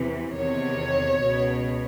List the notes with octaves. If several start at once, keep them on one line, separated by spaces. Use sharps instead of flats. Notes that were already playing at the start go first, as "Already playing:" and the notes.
Already playing: E2 C3 E3
E2 C3 D#3 C#5
C#2 B2